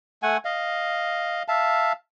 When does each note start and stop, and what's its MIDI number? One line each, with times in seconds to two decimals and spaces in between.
0.23 0.37 57
0.23 0.37 78
0.23 0.37 80
0.45 1.43 75
0.45 1.43 77
1.48 1.92 76
1.48 1.92 77
1.48 1.92 81